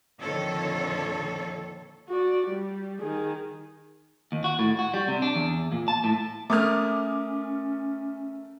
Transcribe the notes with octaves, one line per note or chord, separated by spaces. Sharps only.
F2 A#2 D3 D#3 A4 C#5
F#4 D5
G3
D#3 G#4
D#2
F#4
A2
F#4
G3
C3
D4
E2
A#2
A5
A2
A3 C#4 A#4 D6 D#6 F6